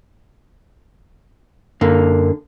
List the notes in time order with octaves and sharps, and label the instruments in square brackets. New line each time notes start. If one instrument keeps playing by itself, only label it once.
[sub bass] F#2 [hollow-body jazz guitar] D3 A#3